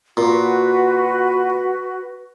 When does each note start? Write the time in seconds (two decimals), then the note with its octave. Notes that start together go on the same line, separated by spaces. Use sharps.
0.17 A#2 F#4 B4